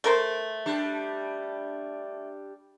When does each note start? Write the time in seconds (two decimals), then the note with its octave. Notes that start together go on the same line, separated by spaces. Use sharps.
0.04 A3 A#4 C5
0.66 G3 D4